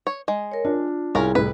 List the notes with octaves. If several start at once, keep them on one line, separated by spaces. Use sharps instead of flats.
C#5
G#3
A#4 C#5
D4 F4
C2 C#4 F4 G#4 A#4
C2 A2 B4